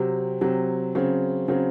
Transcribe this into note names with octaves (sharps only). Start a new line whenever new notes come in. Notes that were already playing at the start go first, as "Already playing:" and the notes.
Already playing: C3 F#3 C4
C3 F#3 C4
C#3 F#3 C4
C#3 F#3 C4